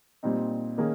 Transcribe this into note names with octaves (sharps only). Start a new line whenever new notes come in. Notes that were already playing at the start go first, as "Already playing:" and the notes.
A#2 G3 C4 D#4
D#3 A#3 C#4 G#4